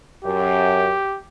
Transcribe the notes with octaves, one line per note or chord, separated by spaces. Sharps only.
F#2 G4